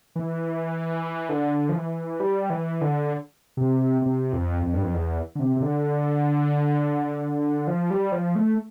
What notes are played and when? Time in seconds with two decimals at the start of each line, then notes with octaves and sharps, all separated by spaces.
0.16 E3
1.29 D3
1.69 F3
1.75 E3
2.20 G3
2.50 E3
2.81 D3
3.57 C3
4.02 C3
4.33 F2
4.63 F2
4.74 G2
4.83 F2
4.94 E2
5.35 D3
5.40 C3
5.56 C3
5.62 D3
7.67 F3
7.90 G3
8.12 F3
8.35 A3